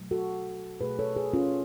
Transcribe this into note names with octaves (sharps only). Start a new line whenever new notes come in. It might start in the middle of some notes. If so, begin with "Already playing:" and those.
Already playing: B2 F#3 A3
F#4 A4
B2 A3 G#4 B4
A4 C#5
G#4 B4
C#4 F4